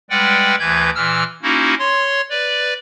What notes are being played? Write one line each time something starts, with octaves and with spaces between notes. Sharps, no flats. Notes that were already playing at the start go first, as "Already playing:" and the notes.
G3 G#3 B4 D5 F#5 G5
D2 E3 B4 G6 G#6
A#2 E3 E6 F6
A#3 C#4 D#4 E4 F#4
C#5 C6
B4 D5